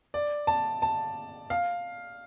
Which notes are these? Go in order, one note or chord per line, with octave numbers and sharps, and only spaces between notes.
D5
A5
A5
F5